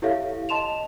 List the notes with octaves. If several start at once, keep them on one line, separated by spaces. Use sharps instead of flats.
E4 G4 A4 C#5 E5 F5
D#5 A5 C6 E7 F7